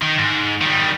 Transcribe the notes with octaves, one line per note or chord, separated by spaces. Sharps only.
D#3
G#2
D#3 G3